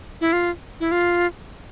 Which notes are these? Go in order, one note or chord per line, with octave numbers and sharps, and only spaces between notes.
E4
F4
E4
F4